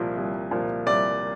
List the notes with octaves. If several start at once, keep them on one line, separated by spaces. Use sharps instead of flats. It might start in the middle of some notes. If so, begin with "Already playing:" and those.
Already playing: C2 A#2 F3
C2
A#2 F3
C2 D5